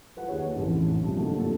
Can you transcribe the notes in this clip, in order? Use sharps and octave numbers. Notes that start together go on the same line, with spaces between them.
F4 B4 F#5
D#2 D#3 G#4 C#5
A1 F2 C#3 E3
B1 G2 C3 F3
D3 D#3 F#3 A3 A#3
C2 A#2 D3 A4